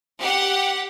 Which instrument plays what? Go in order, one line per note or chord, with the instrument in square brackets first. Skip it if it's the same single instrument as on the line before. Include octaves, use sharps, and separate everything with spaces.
[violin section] G4 F#5